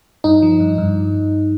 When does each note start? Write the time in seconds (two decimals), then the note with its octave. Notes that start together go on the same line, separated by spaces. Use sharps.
0.24 G2 D#4
0.42 F3
0.60 G2
0.78 G2